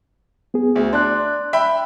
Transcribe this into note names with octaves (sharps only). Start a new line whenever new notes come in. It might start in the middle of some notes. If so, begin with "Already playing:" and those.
B3 G#4
D2
D4 C6 F#6
E5 G5 B5